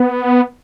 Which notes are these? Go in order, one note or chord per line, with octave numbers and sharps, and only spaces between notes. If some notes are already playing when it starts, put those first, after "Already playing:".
Already playing: B3